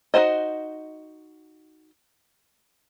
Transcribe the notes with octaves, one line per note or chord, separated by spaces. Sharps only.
D#4 F4 F#4 C5 D#5